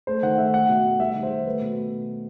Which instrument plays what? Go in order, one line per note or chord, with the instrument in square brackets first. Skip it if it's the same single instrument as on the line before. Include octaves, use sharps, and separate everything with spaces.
[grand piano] A3 C5
D#3 F#5
A3 E5
A3 F#5
B2
A3
G3 E5
D#3
C5
G3
A3 B4
B2